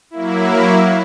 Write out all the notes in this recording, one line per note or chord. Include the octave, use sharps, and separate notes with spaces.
F#3 A#3 E4